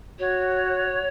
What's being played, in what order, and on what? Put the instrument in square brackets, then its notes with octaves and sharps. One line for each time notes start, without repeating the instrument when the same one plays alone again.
[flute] F#4 [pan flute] C#5